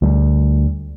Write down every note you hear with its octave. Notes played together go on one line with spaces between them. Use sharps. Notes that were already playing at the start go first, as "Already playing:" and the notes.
D2 G3